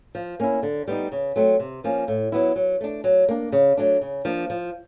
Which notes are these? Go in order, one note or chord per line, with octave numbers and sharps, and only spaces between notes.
F3
A#3 C#4 E4
D3
G3 B3 D#4
C#3
F#3 A3 C4
C3
F3 A#3 C#4
A2
F#3 B3 E4
F#3
A3 D4
F#3
A#3 D4
C#3
F#3 A3 D4
C#3
F3 A#3 D4
F3